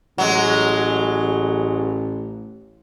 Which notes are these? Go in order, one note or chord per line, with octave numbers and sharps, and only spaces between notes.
A1 F#3 G#3